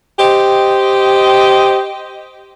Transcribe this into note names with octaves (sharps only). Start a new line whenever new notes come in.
G4 C5 D#5